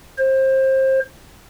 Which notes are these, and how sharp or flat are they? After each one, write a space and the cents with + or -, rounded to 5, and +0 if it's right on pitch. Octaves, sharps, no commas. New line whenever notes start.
C5 +25